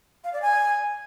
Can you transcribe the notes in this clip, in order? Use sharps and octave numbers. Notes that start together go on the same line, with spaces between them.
F5
D5
G#5